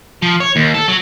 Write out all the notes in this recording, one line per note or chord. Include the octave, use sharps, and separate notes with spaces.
F3
C#5
D#2
A4
F#3